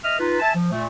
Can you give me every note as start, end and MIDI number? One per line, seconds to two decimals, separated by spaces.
0.03 0.17 75
0.03 0.17 76
0.03 0.17 87
0.03 0.17 89
0.19 0.37 63
0.19 0.37 65
0.19 0.37 71
0.40 0.53 76
0.40 0.53 80
0.40 0.53 81
0.55 0.71 53
0.71 0.86 46
0.71 0.86 57